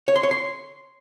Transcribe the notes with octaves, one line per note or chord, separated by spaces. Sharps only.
C#5
C6
C#5
C6